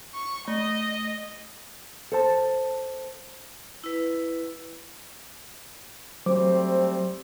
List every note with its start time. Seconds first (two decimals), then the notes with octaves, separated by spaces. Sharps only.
0.14 C#6
0.48 A3 D#5
2.12 A4 C5 A5
3.84 E4 B4
6.26 F#3 G3 A3 C4 C5 D6